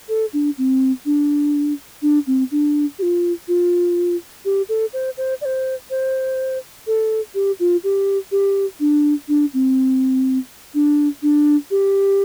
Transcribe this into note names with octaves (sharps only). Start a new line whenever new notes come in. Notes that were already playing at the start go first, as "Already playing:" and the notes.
A4
D4
C4
D4
D4
C4
D4
G4
F4
F4
G4
A4
C5
C5
D5
C5
C5
A4
G4
F4
G4
G4
D4
D4
C4
D4
D4
G4